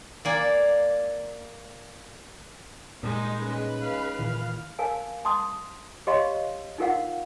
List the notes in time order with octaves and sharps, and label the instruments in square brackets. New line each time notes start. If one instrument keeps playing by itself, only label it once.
[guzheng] A#3 D5 G#5
[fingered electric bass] A#2 G3 [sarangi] G#3 [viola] D#4
[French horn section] C#4 D#4 G#4 [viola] B4
[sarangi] F5
[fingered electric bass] A#2 D#3 E3
[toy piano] A#4 F5 G#5 A5
A5 C6 D#6
G4 C#5 D#5 F5 B5 C6
D#4 F4 A#4 F5 F#5